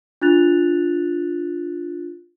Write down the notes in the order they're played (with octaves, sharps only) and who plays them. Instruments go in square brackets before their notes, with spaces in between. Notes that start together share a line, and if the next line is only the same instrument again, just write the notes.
[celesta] D4 F4 F#6 A6 F7